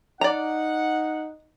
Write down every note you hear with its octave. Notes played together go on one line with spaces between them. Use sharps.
D#4 D5 F#5 A#5